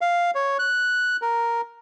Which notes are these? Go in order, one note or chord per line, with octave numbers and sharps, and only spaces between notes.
F5
C#5
F#6
A#4